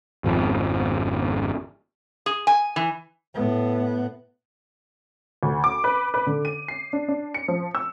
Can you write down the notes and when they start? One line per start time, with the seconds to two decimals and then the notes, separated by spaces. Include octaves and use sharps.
0.24 G#1 F2 F3
2.26 G#4
2.47 G#5
2.76 E3
3.34 A2 B3
5.43 D2
5.64 D6
5.84 B4
6.14 B4
6.27 D3
6.45 D#7
6.68 C7
6.93 D4
7.09 D4
7.34 C#7
7.48 F3
7.75 E6